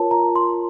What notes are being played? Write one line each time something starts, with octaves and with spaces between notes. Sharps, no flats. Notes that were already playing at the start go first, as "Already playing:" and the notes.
Already playing: F4 A#4 C#5 A5
A#5
C6